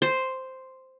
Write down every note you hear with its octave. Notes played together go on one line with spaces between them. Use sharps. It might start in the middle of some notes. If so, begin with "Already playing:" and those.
C5